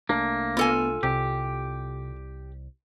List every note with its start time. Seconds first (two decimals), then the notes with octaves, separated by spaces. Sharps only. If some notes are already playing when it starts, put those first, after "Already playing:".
0.09 C2 A3 A#3 D4
0.57 B3 F4 A4 G#5
1.03 C2 C3 G4